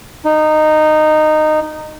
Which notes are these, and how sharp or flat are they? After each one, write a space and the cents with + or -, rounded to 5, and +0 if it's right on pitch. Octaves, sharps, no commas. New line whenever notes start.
D#4 -15